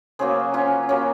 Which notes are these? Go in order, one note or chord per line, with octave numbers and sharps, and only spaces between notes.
C#3 F#3 A#3 G#4 C5
C#4 F4
C#3 F#3 A#3 C#4